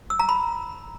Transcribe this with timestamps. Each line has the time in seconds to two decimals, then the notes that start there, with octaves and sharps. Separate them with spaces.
0.10 E6
0.19 A#5
0.29 B5